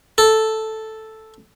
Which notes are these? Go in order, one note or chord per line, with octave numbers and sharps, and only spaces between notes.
A4